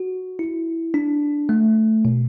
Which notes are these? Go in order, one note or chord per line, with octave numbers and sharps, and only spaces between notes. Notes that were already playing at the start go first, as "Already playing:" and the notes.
Already playing: F#4
E4
D4
A3
B2